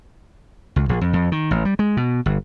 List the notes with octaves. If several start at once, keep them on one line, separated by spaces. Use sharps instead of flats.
C#2
A#1
F2
F2
D#3
A1
G3
G#3
B2
G1